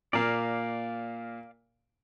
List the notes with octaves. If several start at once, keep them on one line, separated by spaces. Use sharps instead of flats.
A#2 A#3 D5 F5